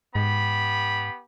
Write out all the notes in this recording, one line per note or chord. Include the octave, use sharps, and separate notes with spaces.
G#2 B3 G4 B5